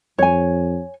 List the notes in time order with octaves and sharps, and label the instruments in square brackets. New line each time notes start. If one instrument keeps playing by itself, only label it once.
[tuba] F2 [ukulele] C#5 G#5